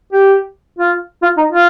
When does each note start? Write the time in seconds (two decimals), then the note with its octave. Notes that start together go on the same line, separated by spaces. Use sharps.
0.13 G4
0.79 F4
1.23 F4
1.37 D#4
1.53 F4